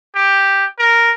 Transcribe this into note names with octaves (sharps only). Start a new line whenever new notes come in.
G4
A#4